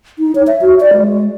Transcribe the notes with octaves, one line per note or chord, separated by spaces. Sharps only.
D#4
C#5
E5
F#4
D5
G#3